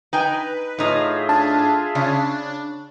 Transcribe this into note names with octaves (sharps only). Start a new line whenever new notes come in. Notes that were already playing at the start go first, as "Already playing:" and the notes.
D#4 B4 G5 G#5
A2 D#4 F4 G#4 E5
D4 A5
C#3 D4